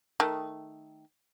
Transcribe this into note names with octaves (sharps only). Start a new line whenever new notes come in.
D#3 A3